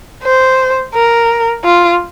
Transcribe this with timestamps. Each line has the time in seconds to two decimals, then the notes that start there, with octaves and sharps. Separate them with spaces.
0.24 C5
0.95 A#4
1.64 F4